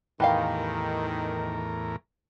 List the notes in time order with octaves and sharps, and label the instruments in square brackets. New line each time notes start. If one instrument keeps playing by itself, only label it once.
[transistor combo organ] E2 A2 A#4 [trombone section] D#3 [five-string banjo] E3 G4 F5